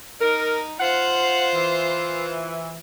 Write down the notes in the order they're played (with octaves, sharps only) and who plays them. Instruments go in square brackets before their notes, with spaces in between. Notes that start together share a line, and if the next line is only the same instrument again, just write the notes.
[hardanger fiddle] D#4 [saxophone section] A#4
[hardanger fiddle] F4 C5 [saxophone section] F5 F#5
[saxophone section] E3